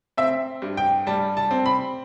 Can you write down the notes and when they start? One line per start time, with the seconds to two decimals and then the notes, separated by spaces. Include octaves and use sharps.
0.17 C4 E5
0.62 G2
0.77 G5
1.07 G3 A5
1.37 A5
1.51 C4
1.66 B5